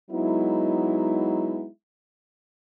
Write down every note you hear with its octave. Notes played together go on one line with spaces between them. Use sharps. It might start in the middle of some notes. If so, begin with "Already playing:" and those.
F#3 G#3 B3 D#4 E4